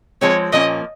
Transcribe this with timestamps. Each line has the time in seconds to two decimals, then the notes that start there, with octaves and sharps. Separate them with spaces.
0.21 F3 G#3 C4 C#5
0.52 A#2 F3 A#3 C#4 D#5